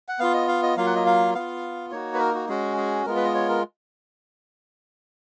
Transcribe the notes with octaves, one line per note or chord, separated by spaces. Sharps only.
F#5
B3 F4 F5
D#5
F5
D#5
F#3 A#3 F4 F5
F#5
D#5
F5
B3 F4 F5
A#3 D#4 F#4 C#5
B4
A#4
F#4
G#3 C#4 F#4 G#4
G#4
G#3 B3 F4 A#4
B4
D#5
C#5
A#4